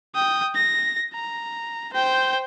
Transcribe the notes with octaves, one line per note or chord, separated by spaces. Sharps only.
G5 D#6
A#6
A#5
C5 G5